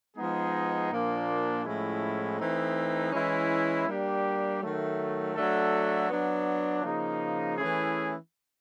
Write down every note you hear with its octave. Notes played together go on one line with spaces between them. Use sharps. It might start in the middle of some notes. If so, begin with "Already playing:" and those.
F3 G#3 B3 D#4 G#4
A#2 F3 A#3 D4
A2 F3 G#3 C#4 E4
E3 A3 C4 D#4
E3 G#3 C#4 E4
G3 A#3 D4 G4
D#3 F#3 A3
F#3 A3 D4 F#4 A4
F#3 B3 D4
C#3 F3 A#3 D#4
E3 A3 C#4 E4 G#4